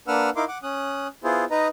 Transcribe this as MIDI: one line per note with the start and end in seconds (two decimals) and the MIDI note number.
0.08 0.30 58
0.08 0.30 62
0.08 0.30 71
0.08 0.30 78
0.08 0.30 88
0.08 0.30 89
0.36 0.45 63
0.36 0.45 64
0.36 0.45 70
0.36 0.45 77
0.36 0.45 84
0.36 0.45 86
0.48 0.58 78
0.48 0.58 86
0.63 1.08 61
0.63 1.08 87
0.63 1.08 90
1.24 1.45 59
1.24 1.45 64
1.24 1.45 65
1.24 1.45 68
1.24 1.45 72
1.51 1.68 63
1.51 1.68 71
1.51 1.68 75
1.51 1.68 82